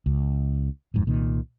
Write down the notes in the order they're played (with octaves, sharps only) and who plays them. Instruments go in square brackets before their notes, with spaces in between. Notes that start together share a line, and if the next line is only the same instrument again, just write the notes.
[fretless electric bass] C#2
D1 F2 G#2
C2 A#2 D#3